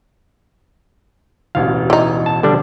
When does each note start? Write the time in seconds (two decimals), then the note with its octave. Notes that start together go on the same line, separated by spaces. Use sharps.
1.55 E1 A1 D2 F5
1.90 E3 D#4
2.26 A5
2.43 D3 G3 D4